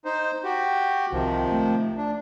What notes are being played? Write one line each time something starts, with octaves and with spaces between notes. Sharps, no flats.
D#4 C5
F#4 G4
C2 C3 D#3 F3
A3
D4